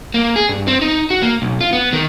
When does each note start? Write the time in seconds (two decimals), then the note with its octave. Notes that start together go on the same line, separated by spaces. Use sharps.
0.14 A#3
0.36 G#4
0.49 G2
0.67 C4
0.81 D#4
1.10 F#4
1.22 A#3
1.42 B1
1.61 F4
1.73 B3
1.93 D#3